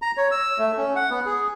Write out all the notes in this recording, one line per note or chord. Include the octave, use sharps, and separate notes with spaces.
A#5
C#5
E6
A3
C#4
F#5
B3
G#4